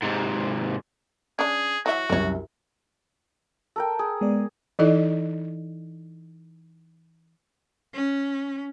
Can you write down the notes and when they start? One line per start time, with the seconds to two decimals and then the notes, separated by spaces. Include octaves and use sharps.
0.02 G#2 C3
1.39 C#4 D4 G#4
1.86 E3 F#3 F#4 E5
2.10 C2 F#2 A#4 C#5
3.76 A4 A#4 G5
3.99 G#4
4.21 G#3 B3 D5
4.79 E3 D#4 E4 A4 D5 D#5
7.94 C#4